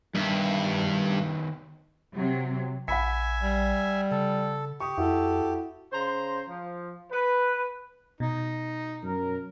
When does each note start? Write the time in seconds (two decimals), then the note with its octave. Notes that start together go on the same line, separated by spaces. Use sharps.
0.15 G2 D#3 B3 E5
2.15 C3 F#3
2.88 A#1 E5 F#5 G#5 B5 B6
3.42 G3
4.11 C#3 A4
4.80 G4 C#6 D#6
4.97 F2 E4 F#4 A4
5.93 C#3 C5 A#5 C6
6.49 F3
7.12 B4
8.20 B2 D#4
9.03 F#2 F#3 A#4